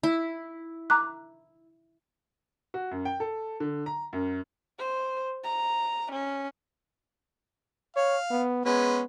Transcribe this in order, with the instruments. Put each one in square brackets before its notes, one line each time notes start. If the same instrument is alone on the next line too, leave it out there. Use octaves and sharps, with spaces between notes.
[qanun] E4
[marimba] A#5 D6 F#6
[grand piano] F#4
F#2
G5
A4
D3
A#5
F#2
[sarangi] C5
A#5
C#4
[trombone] C#5 [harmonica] F5
[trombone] B3
[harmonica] G#3 C#4 B4 [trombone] B3